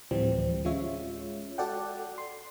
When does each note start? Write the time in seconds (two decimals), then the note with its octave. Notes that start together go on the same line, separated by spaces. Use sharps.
0.11 D2 A2 E3 F3 G3 C4
0.65 G#3 C#4 F4 C#5 E5
1.58 F#4 A4 D5 F#5 G5
2.18 C6